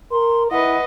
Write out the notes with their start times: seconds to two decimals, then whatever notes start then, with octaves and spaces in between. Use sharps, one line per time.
0.11 A#4 C6
0.51 E4 B4 D#5 F#5